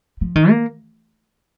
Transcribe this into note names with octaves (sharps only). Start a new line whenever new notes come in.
F3
D#3
A#3